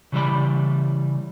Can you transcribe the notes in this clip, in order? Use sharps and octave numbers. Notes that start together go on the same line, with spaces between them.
C#3 E3 G3 E4 D5 B5